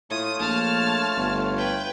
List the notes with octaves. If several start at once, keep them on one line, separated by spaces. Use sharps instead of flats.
A2 A3 F4 C#5 D#6
A#1 A5 F6
G1
B4 G5